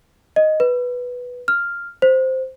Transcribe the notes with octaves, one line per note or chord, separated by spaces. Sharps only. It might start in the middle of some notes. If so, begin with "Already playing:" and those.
D#5
B4
F6
C5